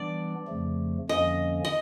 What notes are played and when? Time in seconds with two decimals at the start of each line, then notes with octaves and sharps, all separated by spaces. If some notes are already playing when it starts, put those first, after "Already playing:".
Already playing: E3 G3 B3 D4 D5
0.47 F2 C#3 F3 A3
1.09 F2 D3 F3 A#3 C#4 D#5
1.65 D#5